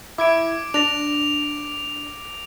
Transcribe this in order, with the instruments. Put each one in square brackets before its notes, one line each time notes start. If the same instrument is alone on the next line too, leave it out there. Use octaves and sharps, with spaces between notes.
[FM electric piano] E4 G#6 [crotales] D6 D7
[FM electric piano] D4 [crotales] A#6 F7